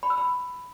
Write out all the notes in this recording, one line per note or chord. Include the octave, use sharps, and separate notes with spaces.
B5
E6
B5